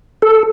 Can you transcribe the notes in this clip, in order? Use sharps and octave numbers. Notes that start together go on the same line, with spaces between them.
A4